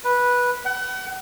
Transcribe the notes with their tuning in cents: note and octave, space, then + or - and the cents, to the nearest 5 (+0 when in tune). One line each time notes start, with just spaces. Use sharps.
B4 -10
F#5 +35